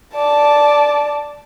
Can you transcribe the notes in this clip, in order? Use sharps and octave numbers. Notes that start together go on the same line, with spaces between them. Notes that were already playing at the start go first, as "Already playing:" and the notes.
D5 A5